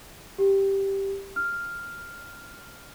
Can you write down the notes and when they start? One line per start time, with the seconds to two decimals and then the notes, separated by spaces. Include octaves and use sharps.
0.38 G4
1.36 F6